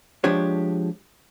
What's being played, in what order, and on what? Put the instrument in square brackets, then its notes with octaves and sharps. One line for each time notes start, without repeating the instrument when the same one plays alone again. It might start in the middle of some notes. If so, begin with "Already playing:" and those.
[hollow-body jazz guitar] F3 G#3 D4 G4 C#5